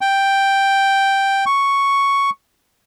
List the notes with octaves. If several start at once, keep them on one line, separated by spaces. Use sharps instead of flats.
G5
C#6